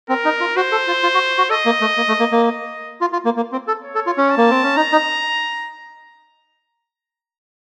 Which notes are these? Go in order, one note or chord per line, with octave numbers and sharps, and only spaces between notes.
C4 A#4
D#4
F4
F#4 C5
A4
F4
F4
F#4
F#4
A4 D#5
A#3
A3
A#3
A3
A#3
A#3
D#5
F4
F4
A#3
A#3
C4
A4
C#5
A4
F4
C#4
A5
A#3
C4
C#4
D#4 A#5
D#4